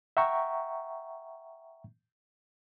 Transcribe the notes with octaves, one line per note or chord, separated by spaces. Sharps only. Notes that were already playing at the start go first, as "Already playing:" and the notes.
E5 F#5 G5 A#5 C#6